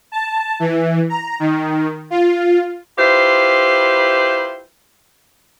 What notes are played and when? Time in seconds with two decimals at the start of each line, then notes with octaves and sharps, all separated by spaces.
0.12 A5
0.60 E3
1.09 A#5
1.40 D#3
2.10 F4
2.98 E4 F4 G4 B4 C5